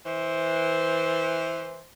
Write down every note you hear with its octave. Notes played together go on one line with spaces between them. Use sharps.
E3 C5